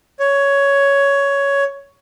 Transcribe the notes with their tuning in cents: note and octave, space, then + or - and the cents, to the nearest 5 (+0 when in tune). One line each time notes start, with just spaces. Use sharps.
C#5 +10